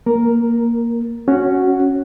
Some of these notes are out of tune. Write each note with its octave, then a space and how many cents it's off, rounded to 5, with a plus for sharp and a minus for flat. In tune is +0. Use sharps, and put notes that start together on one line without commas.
A#3 +0 A#4 +0
C#4 +0 F#4 +0 F#5 +0